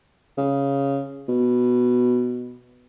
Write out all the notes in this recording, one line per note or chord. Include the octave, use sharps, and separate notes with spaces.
C#3
B2